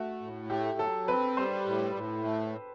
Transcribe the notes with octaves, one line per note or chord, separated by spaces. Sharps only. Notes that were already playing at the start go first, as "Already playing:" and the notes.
Already playing: A3 F#4
A2
A3 G4
F#3 A4
C4 B4
G3 C5
A2
A2
A3